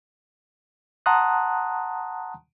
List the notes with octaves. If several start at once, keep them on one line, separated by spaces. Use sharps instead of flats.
F#5 A5 A#5 C6 D#6 F#6